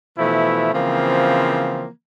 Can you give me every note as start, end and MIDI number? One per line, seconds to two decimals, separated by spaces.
0.19 0.73 47
0.19 0.73 52
0.19 0.73 53
0.19 0.73 57
0.19 0.73 64
0.73 1.88 49
0.73 1.88 52
0.73 1.88 53
0.73 1.88 58
0.73 1.88 60